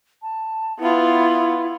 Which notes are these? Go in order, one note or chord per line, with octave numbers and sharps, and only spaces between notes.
A5
B3 E4 F4